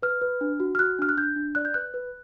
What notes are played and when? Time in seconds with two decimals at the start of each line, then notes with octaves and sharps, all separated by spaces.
0.02 B4 F6
0.21 B4
0.41 D4
0.60 F#4
0.75 F6
0.79 F#4 F#6
0.99 D4 F6
1.09 F#6
1.17 D4 G6
1.36 D4
1.55 D5 F#6
1.65 G6
1.74 B4 F#6
1.94 B4